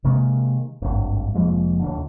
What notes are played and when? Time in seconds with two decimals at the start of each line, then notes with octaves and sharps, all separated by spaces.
0.04 C3 D#3 G#3 A#3
0.82 D1 G#1 G2
1.34 F1 F3 G#3 A#3
1.79 D#1 D2 D3